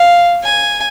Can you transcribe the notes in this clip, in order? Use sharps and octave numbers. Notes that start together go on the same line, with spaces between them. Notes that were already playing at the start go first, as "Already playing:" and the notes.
Already playing: F5
G#5